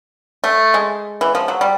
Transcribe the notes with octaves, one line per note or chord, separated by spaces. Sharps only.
A3
G#3
E3
F3
F#3
G3